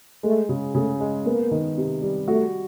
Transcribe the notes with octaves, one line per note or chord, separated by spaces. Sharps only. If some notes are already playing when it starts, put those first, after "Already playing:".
G#3 A3
C#3
C#3 A3
G#3
A#3 B3
D#3
C3
G3
A3 F#4